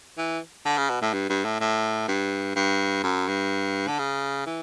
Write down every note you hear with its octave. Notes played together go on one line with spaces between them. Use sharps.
E3
D3
C#3
B2
A2
G2
G2
A2
A2
G2
G2
F#2
G2
D3
C#3
E3